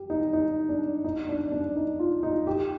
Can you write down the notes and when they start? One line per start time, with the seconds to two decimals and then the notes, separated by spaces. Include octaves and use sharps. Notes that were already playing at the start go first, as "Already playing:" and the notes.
Already playing: G4
0.10 D#4
0.33 D#4
0.69 D4
1.04 D#4
1.28 D4
1.51 D4
1.76 D#4
1.99 F4
2.23 D#4
2.47 G4